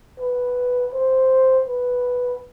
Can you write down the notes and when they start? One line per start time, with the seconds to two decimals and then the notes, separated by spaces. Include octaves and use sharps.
0.20 B4
0.94 C5
1.68 B4